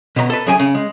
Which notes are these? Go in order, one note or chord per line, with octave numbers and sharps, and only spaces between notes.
B2 B3 C5 A#5
A4 B4
F#2 F#3 G#4 G5 G#5
C#3
G#3